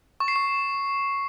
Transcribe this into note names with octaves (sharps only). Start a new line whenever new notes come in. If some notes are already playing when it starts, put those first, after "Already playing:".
C#6
C7
C#6